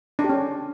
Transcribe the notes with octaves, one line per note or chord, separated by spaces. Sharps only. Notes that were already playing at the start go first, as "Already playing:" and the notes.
D4
G4
C#4